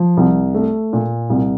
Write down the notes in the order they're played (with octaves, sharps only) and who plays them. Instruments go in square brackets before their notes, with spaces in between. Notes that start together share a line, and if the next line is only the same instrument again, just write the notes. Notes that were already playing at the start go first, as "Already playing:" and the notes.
Already playing: [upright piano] F3
C2
A3
A#2
C2